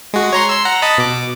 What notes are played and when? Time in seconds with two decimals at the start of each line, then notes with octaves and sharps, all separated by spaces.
0.14 G#3 F#4
0.33 C#5 A#5 C6
0.49 C6 E6
0.65 F#5 A#5
0.82 D#5 A5 B5
0.98 B2 D6